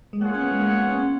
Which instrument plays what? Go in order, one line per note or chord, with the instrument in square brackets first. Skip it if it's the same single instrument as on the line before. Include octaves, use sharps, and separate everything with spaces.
[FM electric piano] G#3
[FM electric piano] A#3 [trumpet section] F4 G#4 C#5 F#5
[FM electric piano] C#4
B3
G#3
A#3
A#3
B3
C#4
C#4